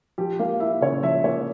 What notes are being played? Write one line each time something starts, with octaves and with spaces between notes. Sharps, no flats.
F3 G4
A#3 F5
E4 E5
C#3 C#5
F3 E5
A#3 C#5